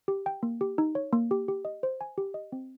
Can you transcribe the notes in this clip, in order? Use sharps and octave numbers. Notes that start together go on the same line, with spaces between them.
G4
G5
A#3
G4
D#4
C#5
A#3
G4
G4
D#5
C5
G#5
G4
D#5
C4